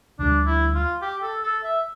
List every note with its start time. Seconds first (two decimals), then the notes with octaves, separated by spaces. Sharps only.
0.19 D2 D3 G3 D4
0.46 E4
0.74 F4
1.02 G4
1.22 A4
1.43 A4
1.64 E5